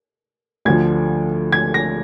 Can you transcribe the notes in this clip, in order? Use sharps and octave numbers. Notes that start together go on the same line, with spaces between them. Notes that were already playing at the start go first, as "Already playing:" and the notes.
D2 D3 F3 G#6
G#6
A#6